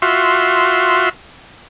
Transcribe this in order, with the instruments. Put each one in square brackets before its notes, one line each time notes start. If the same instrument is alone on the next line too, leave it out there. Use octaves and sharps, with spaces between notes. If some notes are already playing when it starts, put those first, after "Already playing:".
[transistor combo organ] F4 F#4 E5 C6